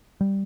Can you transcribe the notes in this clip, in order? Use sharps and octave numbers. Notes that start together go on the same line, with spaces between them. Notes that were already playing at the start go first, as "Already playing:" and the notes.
G3